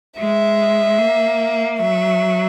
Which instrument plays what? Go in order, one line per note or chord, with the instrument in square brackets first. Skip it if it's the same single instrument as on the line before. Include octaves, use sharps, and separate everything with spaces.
[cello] G#3 [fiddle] E5
[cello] A#3
[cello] F#3 [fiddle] E5